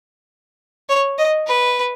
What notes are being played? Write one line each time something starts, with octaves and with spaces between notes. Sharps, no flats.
C#5
D#5
B4